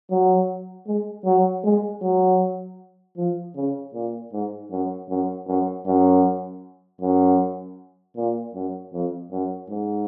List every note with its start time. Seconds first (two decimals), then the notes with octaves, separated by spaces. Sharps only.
0.11 F#3
0.87 G#3
1.25 F#3
1.64 G#3
2.02 F#3
3.17 F3
3.55 C#3
3.94 A#2
4.33 G#2
4.71 F#2
5.09 F#2
5.47 F#2
5.86 F#2
7.01 F#2
8.16 A#2
8.54 F#2
8.93 F2
9.31 F#2
9.69 G#2